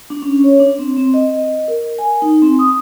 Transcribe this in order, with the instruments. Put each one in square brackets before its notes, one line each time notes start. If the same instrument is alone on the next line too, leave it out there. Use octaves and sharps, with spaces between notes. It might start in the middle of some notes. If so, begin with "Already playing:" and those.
[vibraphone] D4
C#4
C#5
D4
C4
C4
D#5
A#4
G#5
D#4
C4
D#6